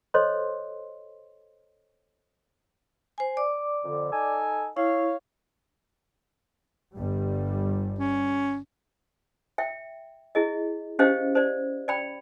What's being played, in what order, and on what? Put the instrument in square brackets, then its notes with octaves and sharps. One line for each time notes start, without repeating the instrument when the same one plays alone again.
[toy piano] A4 C5 C#5 D#5 C6
[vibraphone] C5 G#5
D5 D6
[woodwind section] F2 D3
D#4 A4 G#5
[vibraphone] E4 [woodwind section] C#5 F5
[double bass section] G1 G3
[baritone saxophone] C#4
[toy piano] E5 G5
E4 G#4 D#5
C#4 G4 C5 D#5 F5 G5
C5 D5
D5 G5 B5